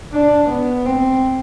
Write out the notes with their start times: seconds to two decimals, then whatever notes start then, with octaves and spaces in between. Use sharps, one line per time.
0.13 D4
0.49 B3
0.85 C4